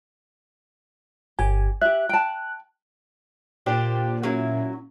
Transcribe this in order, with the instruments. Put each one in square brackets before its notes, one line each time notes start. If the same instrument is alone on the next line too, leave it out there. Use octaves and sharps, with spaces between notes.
[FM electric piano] G1 G#5 [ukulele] G4
[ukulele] G4 E5 [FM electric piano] F#6
[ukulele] G5 A5
[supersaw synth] A#2 [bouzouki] D4 G4 C5
[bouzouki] F#3 E4 [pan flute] C#4